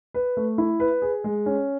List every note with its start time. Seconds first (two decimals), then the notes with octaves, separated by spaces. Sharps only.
0.14 B4
0.37 A3
0.58 E4
0.80 B4
1.02 G#4
1.24 G#3
1.46 C#4